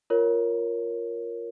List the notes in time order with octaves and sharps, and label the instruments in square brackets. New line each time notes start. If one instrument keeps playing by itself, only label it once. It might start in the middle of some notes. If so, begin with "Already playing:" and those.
[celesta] F4 A#4 C#5